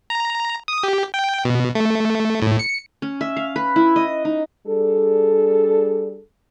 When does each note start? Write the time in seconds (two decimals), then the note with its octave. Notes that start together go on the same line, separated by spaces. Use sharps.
0.10 A#5
0.68 D#6
0.83 G4
1.14 G5
1.45 B2
1.75 A3
2.42 A2
2.59 C#7
3.02 C#4
3.21 E5
3.37 F5
3.56 B4
3.76 E4
3.96 D#5
4.25 D#4
4.67 G3 D4 G#4 A4